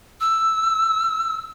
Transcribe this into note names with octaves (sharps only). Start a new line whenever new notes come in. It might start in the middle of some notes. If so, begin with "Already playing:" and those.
E6